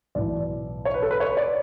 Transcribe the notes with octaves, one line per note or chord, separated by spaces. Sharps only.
B1 A2 E3 D5
C#5
B4
A4
B4
C#5
D5